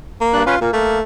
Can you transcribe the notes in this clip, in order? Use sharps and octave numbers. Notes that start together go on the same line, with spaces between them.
A#3
G2 D4 F#6
C#4 F4 B4
A#2 A#3
A3 A#3